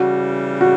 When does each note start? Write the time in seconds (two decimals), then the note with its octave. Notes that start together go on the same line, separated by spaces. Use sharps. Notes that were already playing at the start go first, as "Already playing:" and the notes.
Already playing: C#3 E3 G3 F#4
0.61 F#4